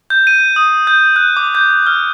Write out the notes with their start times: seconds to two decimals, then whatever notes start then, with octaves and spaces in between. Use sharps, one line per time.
0.10 G6
0.27 D#7
0.56 D#6
0.87 G6
1.16 F#6
1.37 D6
1.55 G6
1.87 F6